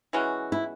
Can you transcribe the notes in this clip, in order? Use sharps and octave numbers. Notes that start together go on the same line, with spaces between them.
E3 G#3 C#4 F#4
E4